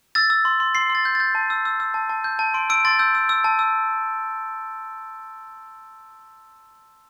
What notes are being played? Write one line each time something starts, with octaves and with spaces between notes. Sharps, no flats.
E6 A6
E6
C6
C6
C6 C7
C6
A6
G6
A6
G6
A5
E6
E6
E6
A5
A5
G6
A5
C6 D7
E6 D7
C6 A6
E6 G6
E6
E6
A5
E6